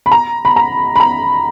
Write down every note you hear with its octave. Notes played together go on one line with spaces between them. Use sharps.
B5
A#5
B5
A#5
B5
A#5